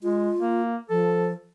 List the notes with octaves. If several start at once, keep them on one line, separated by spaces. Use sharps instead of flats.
G#3 F4
A#3
F3 A4